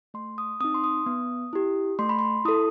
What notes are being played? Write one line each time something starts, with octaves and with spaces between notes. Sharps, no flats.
A3 C6
D#6
C4 D#4 D#6
C6
D#6
B3
E4 G4
A3 C6
B5
C6
E4 A4 D#6